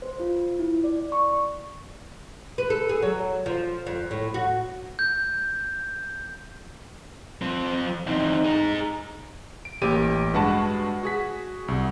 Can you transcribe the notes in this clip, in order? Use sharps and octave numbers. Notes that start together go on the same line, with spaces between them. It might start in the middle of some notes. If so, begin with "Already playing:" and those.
C5
F4
E4
D5
C#6
B4
A4
G#4
F#3
F3
F2
A2
F#4
G6
F3 C4
E2 C4 D#4
G#4 A#5
D7
A1 A#3 G4 D7 D#7
G2 G#3 F#4 B4 F#5 A5
F#4 G#4 B6
C2